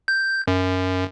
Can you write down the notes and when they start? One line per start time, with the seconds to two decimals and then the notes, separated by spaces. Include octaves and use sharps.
0.08 G6
0.48 F#2